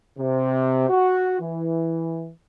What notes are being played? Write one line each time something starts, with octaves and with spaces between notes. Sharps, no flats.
C3
F#4
E3